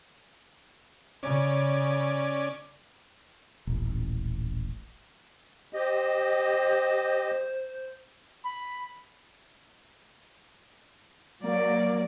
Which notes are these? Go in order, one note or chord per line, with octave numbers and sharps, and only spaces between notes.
C#3 C#4 D5
D#1 A1
G4 C5 D#5
B5
F#3 A#3 D5